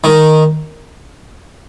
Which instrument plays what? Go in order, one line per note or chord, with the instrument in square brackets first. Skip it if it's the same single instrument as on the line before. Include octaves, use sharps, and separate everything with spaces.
[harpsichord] D#3